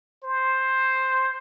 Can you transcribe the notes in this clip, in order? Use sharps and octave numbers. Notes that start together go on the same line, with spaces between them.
C5